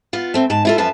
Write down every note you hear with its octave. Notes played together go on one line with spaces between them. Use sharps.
B3 F4
A3 C4
G#2 A5
E4 F4 A4
F#2 F3 F4 B4 A5